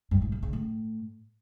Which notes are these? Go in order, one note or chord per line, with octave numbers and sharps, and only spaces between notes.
G2
A2
C#3
C#3
A2